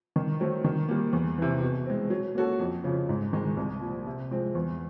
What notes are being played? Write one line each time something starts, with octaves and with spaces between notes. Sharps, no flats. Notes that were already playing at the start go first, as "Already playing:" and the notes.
D#3
F#3 A3 C4
D#3
G3 A#3
E2
C3 E3
B2
G#3 C4
F#3
A#3 C#4 F#4 A4
F2
C#3 F3
G#2
D#3 G#3
C2
A#2
F3
C3
F3 G#3 C4
E2